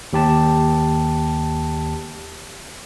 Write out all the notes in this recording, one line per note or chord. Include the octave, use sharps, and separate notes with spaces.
D#2 G4 A5